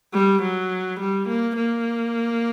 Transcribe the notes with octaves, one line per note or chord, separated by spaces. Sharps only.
G3
F#3
G3
A#3
A#3